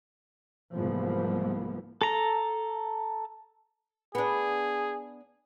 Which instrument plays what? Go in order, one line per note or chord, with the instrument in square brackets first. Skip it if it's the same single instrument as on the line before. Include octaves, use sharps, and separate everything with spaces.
[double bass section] C2 G#2 E3 F3 A#3 B3
[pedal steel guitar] A4 A#5
[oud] B3 D4 [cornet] G#4